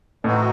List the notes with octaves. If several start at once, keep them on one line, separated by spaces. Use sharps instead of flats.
A2 E3 C4 D#4 F#4